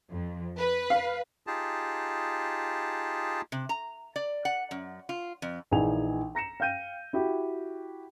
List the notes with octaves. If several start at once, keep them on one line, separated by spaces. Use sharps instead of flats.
F2
B4
F5
D#4 F4 G4 G#4 A5
C3
A#5
D5
F#5
F#2
F4
F2
A#1 E3 D#4 G#4 G#5 F7
A#5 A#6 C#7 E7
F5 G5 G6 D#7
E4 F#4 G4